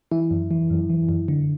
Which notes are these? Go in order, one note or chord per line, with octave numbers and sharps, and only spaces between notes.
E3 E4
F#2
E3
F#2
E3
F#2
D3